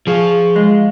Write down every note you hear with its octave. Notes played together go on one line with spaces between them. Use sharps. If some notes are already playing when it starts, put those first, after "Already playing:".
F3 G#4 F5 C#6
G#3